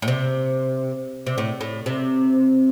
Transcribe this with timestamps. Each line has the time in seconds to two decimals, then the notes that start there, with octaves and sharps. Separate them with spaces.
0.02 A2
0.08 C3
1.27 C3
1.38 A2
1.61 A2
1.86 C3